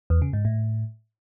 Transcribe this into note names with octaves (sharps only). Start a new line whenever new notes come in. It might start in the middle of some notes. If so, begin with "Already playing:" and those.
E2
C#3
G#2
A2